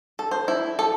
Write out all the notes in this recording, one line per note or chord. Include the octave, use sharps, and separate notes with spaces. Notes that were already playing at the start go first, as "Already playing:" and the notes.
A4
C5
E4
A4